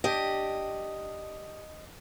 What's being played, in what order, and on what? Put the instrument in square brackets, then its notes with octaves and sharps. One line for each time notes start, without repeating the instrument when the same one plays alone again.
[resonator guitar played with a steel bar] D4 G4 [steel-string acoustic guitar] D#5